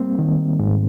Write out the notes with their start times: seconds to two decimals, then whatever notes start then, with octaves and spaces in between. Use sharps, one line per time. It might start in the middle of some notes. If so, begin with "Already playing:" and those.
Already playing: G3 A#3 C4
0.19 D#3
0.59 G#2